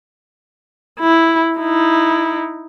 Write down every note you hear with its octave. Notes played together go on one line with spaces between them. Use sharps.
E4
D#4 E4